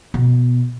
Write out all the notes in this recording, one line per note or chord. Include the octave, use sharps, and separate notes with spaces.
B2